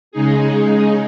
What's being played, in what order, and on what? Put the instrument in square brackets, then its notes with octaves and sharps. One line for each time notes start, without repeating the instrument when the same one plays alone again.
[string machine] C#3 G#3 D#4 G#4